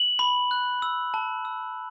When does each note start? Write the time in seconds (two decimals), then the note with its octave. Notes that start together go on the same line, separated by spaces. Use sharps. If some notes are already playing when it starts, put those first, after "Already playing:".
Already playing: F#7
0.19 B5
0.51 F#6
0.82 E6
1.14 A5
1.45 E6